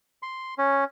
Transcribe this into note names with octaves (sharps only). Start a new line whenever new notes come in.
C6
C#4